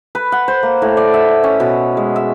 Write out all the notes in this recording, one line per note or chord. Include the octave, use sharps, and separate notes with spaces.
B4
F#5
C5
A#3
A2
D5
E5
C#4
B2
G#3
E5